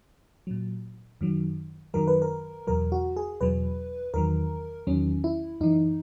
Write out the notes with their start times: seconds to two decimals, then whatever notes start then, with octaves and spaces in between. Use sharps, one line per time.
0.47 A#2 F#3
1.21 F#2 D#3 F#3
1.94 F#2 D#3 F#3 A#4
2.08 B4
2.22 A#4
2.67 E2 B2 F#3 A#4
2.92 F#4
3.16 G#4
3.41 E2 B2 F#3 B4
4.14 E2 D#3 F#3 A#4
4.87 E2 D#3 F#3 C#4
5.24 E4
5.61 F#2 E3 D#4